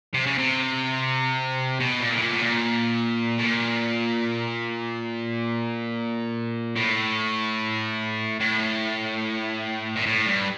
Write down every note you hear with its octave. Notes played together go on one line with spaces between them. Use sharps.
C3
C#3
C3
B2
A#2
A2
A#2
A2
A#2
A2
A#2
A2
A2
A#2
A2
G2